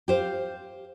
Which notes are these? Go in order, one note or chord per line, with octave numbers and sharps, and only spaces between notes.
G4 C5 F5